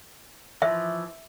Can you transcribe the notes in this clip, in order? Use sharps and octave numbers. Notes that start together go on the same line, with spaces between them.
E3 F3 E5